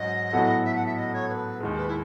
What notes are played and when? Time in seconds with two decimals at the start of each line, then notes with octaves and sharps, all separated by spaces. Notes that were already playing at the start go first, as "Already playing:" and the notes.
Already playing: G#2 F#3 C#4 D#5
0.33 A2 F#3 B3 F#4 A4
0.65 E5
0.75 F#5
0.86 E5
0.97 D#5
1.13 C#5
1.29 B4
1.60 D#2 D#3 G#3
1.77 B4
1.88 E4